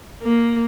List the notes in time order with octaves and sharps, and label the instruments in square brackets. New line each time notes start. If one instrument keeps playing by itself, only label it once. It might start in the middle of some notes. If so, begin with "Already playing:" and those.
[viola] A#3